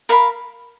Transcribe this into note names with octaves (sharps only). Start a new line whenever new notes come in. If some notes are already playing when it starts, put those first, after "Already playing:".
A#4 F5 B5